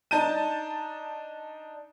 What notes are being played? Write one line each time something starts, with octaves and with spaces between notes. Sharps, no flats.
D4 D#4 A5 G6 D#7